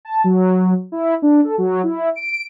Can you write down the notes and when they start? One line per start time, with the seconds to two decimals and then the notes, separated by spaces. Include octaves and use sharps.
0.05 A5
0.24 F#3
0.92 E4
1.22 D4
1.44 A4
1.58 F#3
1.84 E4
2.15 D7